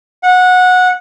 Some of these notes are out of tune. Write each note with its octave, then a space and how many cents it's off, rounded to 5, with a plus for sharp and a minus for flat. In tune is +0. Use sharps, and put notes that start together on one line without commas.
F#5 -20